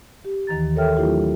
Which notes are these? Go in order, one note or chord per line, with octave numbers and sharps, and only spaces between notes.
G4
D#2 D#3 E3 A#5 A6
A4 A#4 C#5 E5 G5 F6
F#3 A3 D4 E4 F4 G4